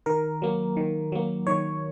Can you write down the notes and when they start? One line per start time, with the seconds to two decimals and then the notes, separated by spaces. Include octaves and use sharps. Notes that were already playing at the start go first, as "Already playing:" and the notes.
0.06 D#3 A#4
0.42 F#3 A#3
0.77 D#3
1.12 F#3 A#3
1.47 D#3 C#5